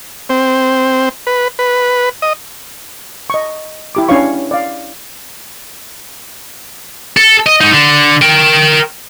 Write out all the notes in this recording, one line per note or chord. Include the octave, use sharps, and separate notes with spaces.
C4
B4
B4
D#5
D#5 C#6
E4 G4 D6
C#4 D4 E4 C#5 F5 C#6
D5 F5
A4
D#5
G#2 D#4
D3
A#4 G5